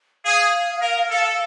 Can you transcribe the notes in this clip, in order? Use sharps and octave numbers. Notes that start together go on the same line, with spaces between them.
G#4 F5
A#4
A4